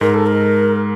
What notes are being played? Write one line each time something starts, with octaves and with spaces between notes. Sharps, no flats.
G#2 G#3 A#4
A4
A#4